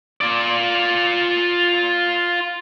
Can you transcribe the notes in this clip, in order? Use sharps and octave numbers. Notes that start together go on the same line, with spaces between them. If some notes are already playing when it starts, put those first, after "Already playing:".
F4 D5